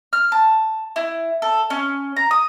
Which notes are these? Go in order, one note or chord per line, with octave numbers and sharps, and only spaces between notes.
F6
A5
E4
A4
C#4
A#5
D#6